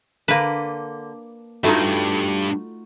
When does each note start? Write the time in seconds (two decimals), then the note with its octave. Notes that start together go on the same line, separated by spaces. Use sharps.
0.28 D3 A#3 B4
1.64 G2 A3 D#4 F4 F#4